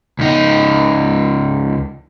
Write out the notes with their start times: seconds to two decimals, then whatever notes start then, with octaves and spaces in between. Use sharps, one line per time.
0.19 C#2 D#4